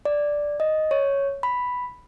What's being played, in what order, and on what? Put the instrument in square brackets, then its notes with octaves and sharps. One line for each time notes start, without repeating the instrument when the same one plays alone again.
[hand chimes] D5
D#5
C#5
B5